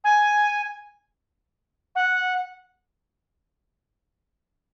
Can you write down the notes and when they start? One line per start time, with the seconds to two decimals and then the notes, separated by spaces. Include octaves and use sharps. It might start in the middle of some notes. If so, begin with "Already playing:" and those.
0.04 G#5
1.95 F#5